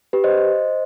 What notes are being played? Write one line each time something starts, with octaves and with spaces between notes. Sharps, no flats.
G4 B4
C5 D#5